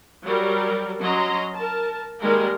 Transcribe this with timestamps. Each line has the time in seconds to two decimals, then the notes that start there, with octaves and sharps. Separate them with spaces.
0.23 F#3 G3 A#4
1.00 F#3 C#4 D#5 A#5 C6
1.54 A#4 A5
2.21 D#3 G3 G#3 A#3 A#4